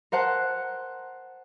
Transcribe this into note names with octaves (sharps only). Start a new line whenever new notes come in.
A#4 C5 F#5 A5 F#6